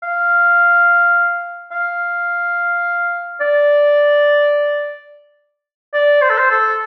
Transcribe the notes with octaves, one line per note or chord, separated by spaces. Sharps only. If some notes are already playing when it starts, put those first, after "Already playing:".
F5
F5
D5
D5
C5
A4
C5
A4